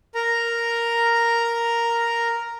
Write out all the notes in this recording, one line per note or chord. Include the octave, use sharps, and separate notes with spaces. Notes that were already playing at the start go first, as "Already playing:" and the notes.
A#4 A#5